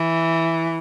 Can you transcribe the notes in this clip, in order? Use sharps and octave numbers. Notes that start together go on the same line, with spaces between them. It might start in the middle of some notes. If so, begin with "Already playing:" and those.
Already playing: E3